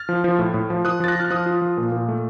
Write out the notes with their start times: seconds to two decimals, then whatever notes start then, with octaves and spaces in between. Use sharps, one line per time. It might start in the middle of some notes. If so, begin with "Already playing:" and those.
Already playing: F6 A6
0.09 F3
0.24 F3
0.39 A2
0.54 A2
0.70 F3
0.84 F3 D#6 F#6
1.00 F3 A6
1.08 F#6 A#6
1.15 F4 F6 A6
1.30 F3 D#6 F#6
1.46 F4
1.62 F3
1.77 A#2
1.92 A#2
2.08 A3